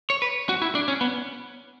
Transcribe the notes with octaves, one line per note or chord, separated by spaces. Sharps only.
C#5
B4
F#4
E4
D4
C#4
B3